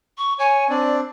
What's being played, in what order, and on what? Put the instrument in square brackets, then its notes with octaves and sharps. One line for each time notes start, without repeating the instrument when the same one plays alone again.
[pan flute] C#6
[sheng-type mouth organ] C#5 [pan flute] G#5
[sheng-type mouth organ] C4 D4 [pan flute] D5